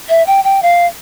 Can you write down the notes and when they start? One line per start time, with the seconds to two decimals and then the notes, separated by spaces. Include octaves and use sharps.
0.09 E5
0.27 G5
0.44 G5
0.63 F5